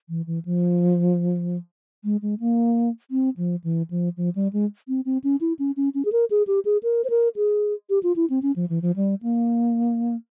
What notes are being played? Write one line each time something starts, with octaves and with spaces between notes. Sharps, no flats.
E3
E3
F3
G#3
G#3
A#3
C4
F3
E3
F3
F3
G3
G#3
C4
C4
C#4
E4
C#4
C#4
C#4
G#4
A#4
G#4
G4
G#4
A#4
C5
A#4
G#4
G4
F4
E4
C4
C#4
F3
E3
F3
G3
A#3